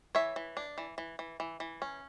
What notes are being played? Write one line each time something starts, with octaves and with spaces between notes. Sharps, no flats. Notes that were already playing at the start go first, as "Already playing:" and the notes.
E3 C#5 E5
E3
D4
E3
E3
E3
E3
E3
C#4